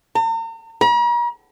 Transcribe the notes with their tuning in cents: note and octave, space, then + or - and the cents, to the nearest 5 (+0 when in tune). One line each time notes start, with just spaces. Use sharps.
A#5 -45
A#5 +45